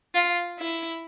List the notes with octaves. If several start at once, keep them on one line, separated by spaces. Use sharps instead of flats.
F4
E4